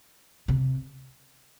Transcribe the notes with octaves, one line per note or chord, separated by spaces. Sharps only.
C3